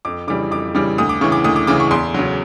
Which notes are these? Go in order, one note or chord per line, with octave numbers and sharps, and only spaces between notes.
F2 D6
C#3 E3 G3 D6
F2 D6
C#3 E3 G3 D6
D2 D#6
D6
C#3 E3 C#6
D6
D2 D#6
D6
C#3 E3 D6
C#6
E2 C6
C#3 F#3